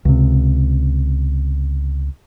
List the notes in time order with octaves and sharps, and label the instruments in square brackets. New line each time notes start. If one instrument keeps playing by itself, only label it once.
[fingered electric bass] C#2 C3